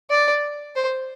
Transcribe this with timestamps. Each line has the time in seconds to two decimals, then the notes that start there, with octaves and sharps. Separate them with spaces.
0.10 D5
0.76 C5